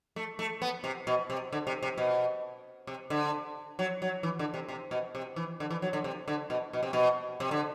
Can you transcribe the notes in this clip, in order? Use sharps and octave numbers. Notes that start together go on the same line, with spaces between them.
A3
A3
B3
C3
B2
C3
D3
C3
C3
B2
C3
D3
F#3
F#3
E3
D3
C3
C3
B2
C3
E3
D3
E3
F#3
D3
C3
D3
B2
B2
C3
B2
C3
D3